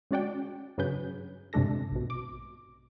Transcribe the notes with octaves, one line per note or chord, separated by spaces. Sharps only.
G#3 C#4 F#4 D5 F#5 G5
G2 C#3 F#3 G#4 B4 G6
G2 C3 G#3 D4 A4 A#6
A#1 B2
D6